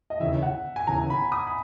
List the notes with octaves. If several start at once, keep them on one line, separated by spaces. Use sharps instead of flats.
D#5
D#2 C#3 E3 E5
F#5
G#5
D#2 C#3 E3 A#5
B5
D#6
B5